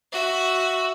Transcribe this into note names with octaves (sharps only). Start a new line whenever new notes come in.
F#4 E5